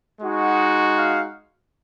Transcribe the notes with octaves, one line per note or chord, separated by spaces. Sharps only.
G#3 D#4 F#4
F5